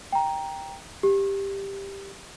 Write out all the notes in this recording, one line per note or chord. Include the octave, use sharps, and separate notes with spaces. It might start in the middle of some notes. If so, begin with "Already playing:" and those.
G5 A#5
G4